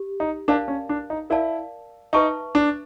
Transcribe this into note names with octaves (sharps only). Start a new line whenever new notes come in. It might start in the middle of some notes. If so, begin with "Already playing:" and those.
Already playing: G4
D#4
D4 A#4 D5 F5 A5
C#4
D4
D#4
E4 A#4 D5 F5 A5
D#4 B4 E5 A5 C#6
D4